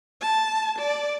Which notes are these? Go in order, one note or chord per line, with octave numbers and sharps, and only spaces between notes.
A5
D5